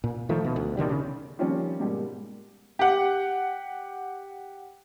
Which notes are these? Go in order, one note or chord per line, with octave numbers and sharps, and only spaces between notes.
A#2
D#3 F3 A3
B2
D2
B2 D3 D#3 G3
C#3
D#3 F3 G3 A#3 C4 C#4
G#2 B2 G3 A#3
G4 F#5